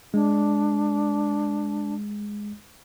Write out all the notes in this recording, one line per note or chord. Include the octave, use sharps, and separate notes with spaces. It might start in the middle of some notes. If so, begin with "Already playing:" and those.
G#3 D4